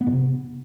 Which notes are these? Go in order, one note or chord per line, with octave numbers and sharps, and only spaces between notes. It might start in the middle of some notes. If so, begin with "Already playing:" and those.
B3
A2
C3